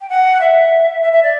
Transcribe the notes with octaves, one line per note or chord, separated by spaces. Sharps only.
G5
F#5
E5
E5
E5
D5